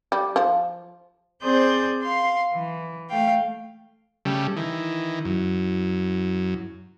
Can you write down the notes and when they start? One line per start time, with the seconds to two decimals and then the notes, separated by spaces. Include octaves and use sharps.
0.12 G3
0.36 F3
1.42 C4 G#4 C5 D5 G6
2.02 F5 C6
2.52 E3
3.09 A3 F5 G5
4.25 C#3 G3 A3
4.57 D#3 E3 E4
5.25 F#2